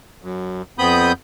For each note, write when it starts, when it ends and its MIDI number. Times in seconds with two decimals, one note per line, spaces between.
0.22 0.62 42
0.79 1.12 41
0.79 1.12 59
0.79 1.12 60
0.79 1.12 83
0.79 1.12 87
0.79 1.12 91